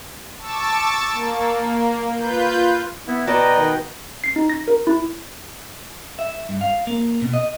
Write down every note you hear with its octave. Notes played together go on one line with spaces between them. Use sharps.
A5 C#6 D6 E6 A6
A#3
F4 B4 G6
B3 E4
B2 F#4 B4 D5 D#5 G5 A5 A#5
D#3
C7
D#4
A#6
A#4
E4
E5
G2
F5
A#3
B2
D#5